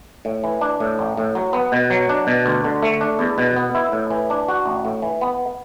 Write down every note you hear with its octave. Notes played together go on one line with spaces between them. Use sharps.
A2
E3
D4
A2
A1
A2
F#3
B3
B2
F#3
D4
B2
D2
D3
A3
D4
E2
B2
B3
E4
A2
E3
D4
F#4
A1
A2
E3
B3